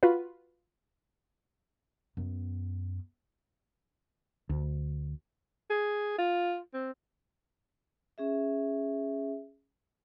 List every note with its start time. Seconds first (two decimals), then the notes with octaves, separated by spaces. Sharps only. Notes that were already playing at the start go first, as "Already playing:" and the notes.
0.03 F4 F#4 B4
2.17 F#2 B3
4.49 D2
5.70 G#4
6.19 F4
6.74 C4
8.18 C#4 G#4 E5